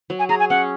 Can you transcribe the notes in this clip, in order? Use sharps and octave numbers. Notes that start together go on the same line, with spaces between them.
F#3
G#5
G#4 A#5
G#5
C#4 F#5